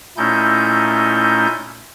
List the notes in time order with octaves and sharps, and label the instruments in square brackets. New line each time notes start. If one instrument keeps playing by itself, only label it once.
[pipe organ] A#2 A3 C#4 D#4 E4 G6